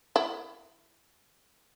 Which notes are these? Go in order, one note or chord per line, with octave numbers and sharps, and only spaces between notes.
E4